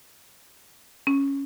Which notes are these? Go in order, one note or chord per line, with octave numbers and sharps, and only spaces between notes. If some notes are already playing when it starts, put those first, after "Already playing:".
C#4